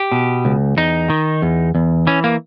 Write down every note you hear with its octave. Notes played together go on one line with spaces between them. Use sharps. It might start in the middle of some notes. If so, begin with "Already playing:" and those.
Already playing: G4
B2
C#2
E2 D#4
D#3
E2
E2
E3 C#4
A#3